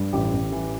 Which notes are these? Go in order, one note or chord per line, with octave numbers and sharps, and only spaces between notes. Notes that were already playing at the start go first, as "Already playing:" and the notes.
Already playing: G2
A1 G4
A1
E3